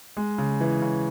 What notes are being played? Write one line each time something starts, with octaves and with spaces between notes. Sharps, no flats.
G#3
C#3
E3
C#3